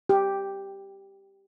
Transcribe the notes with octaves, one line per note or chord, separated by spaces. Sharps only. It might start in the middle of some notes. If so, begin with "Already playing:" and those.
G4